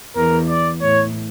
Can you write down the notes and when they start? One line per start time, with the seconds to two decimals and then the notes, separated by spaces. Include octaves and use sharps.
0.16 E2 A#4
0.49 D5
0.82 A2 C#5